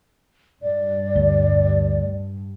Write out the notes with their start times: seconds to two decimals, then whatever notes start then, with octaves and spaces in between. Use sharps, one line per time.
0.63 G2 D5
1.16 D2